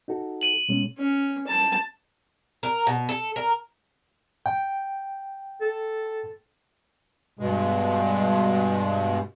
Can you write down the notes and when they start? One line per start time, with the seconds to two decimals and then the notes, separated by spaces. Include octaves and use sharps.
0.08 D#4 F#4 A4
0.41 D#7 F#7
0.68 B2 G#3 C#4
0.98 C#4
1.47 A5
2.63 A#4
2.87 B2
3.09 A4
3.36 A#4
4.46 G5
5.61 A4
7.39 G2 B2 G#3